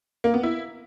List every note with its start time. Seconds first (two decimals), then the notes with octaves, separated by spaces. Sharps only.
0.24 A#3
0.34 B3
0.43 E4